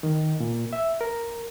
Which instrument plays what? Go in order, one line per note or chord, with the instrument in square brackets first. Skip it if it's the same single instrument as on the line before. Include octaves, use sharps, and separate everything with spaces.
[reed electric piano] D#3
A#2
E5
A#4